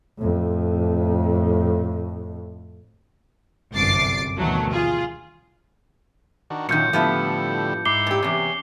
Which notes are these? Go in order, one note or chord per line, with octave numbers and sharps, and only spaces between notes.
F2 A2
G1 C2 F#2 D6 A6 C7
D2 B2 D#3 E3 F#3 A3
F4 G#4
D#3 D4 F#4
F#2 A#2 D#3 F#3 G6 C#7
A2 D3 F3 G3 B3 E4
G#2 E4 D6 C7 G7
A#2 G4
E2 C3 C#4